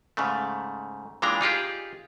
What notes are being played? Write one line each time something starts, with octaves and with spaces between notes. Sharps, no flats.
G#2 C#3 A3
A#2 E3 G#3 D4 G5 A#5
D#4 F4 G4 G#4